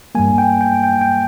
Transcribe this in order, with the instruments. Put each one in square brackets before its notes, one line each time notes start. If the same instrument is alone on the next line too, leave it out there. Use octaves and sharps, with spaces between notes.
[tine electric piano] G2 G3 A#3 G#5
G5
G5
G5
G5